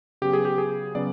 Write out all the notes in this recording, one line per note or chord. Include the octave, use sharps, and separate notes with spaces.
C#3 F#3 B3 G4
G#4
G4
G#4
C#3 F#3 B3 D5